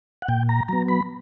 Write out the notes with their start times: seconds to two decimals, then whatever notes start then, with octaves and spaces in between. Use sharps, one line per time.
0.22 F#5
0.29 A#2 G5
0.49 A#5
0.68 F#3 B3 A#5
0.88 B5